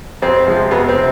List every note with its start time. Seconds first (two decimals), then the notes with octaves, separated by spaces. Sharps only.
0.22 F2 C4
0.47 C3 F3 G#3
0.71 F2 B3
0.83 B3
0.89 C4
0.96 C3